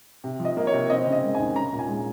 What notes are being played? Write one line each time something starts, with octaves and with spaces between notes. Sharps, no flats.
C3
F3
D#5
A#3
C#5
C3
C4 D#5
C#3
D#5
G#3
G#5
D#2
C#4 A#5
A#2
G#5
G#3